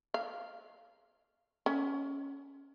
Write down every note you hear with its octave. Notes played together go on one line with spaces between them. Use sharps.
F5
C#4